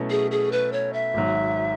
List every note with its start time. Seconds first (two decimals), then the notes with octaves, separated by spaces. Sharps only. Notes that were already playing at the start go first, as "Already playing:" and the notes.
Already playing: B2 F#3 A3 C#4 E4
0.10 G#4
0.31 G#4
0.52 B4
0.73 C#5
0.93 E5
1.14 G#1 G#2 F#3